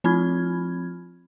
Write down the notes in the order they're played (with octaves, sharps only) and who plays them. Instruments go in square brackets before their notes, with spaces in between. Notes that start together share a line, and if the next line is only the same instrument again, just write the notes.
[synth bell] F3 C4 F4 B5 F6 G#6